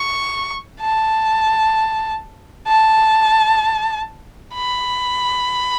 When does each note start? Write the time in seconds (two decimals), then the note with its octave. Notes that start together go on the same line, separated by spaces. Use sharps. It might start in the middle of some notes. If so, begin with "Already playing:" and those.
Already playing: C#6
0.81 A5
2.67 A5
4.53 B5